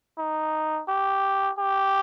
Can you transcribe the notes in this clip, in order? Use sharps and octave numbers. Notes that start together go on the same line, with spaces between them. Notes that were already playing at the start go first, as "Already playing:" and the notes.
D#4
G4
G4